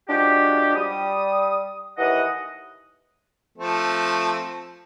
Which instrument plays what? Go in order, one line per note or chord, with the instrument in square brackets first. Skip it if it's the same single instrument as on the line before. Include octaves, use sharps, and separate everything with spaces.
[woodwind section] F3 G#3 D4 F#4 G4
G3 D#6
D#2 E3 D#5 F#5
[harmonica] F3 A3 C4